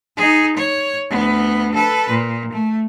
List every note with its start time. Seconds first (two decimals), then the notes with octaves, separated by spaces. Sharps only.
0.17 D#4 G#4
0.57 C#5
1.10 D2 B3
1.75 A4 B4
2.10 A#2
2.53 A3